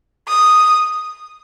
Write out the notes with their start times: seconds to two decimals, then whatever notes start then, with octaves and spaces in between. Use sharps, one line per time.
0.28 D#6